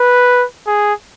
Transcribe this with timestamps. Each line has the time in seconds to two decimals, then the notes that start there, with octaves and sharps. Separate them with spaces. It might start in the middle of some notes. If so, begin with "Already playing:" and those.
Already playing: B4
0.67 G#4